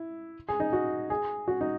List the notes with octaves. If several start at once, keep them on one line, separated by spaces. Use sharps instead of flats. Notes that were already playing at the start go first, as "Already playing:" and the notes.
Already playing: E4
G#4
D#4
F#4
G#4
F#4
D#4